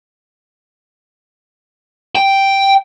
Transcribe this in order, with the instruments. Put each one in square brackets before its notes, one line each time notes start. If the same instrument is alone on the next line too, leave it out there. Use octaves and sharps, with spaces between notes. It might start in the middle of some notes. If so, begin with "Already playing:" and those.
[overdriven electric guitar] G5